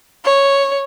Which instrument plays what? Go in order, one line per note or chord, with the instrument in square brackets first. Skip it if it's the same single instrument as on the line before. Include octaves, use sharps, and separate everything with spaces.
[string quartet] C#5